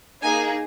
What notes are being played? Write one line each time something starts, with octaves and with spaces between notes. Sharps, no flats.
A#3 D#4 G#4 G#5